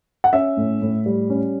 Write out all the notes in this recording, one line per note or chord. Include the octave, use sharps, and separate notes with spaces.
F#5
C#4 E5
A2
A2
G3
C#4